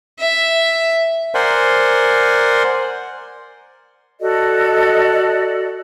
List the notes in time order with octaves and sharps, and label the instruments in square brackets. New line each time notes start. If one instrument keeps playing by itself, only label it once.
[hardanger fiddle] E5
[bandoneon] A#4 C5 D5 F#5 G#5 C6
[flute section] F#4 A4 D5 D#5